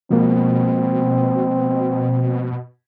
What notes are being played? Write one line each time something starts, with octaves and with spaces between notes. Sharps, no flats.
B2 F3 G#3 A#3 C4